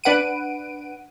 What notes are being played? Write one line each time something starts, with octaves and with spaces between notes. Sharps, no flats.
D4 B4 F#5 D7 D#7